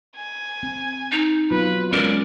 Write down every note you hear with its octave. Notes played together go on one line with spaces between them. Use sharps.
G#5
C4
D#4
F#3 B3 F4 B4
G#3 C#4 A#4 D5